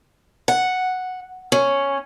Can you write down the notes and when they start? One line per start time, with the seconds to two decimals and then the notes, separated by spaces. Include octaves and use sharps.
0.48 F#5
1.52 C#4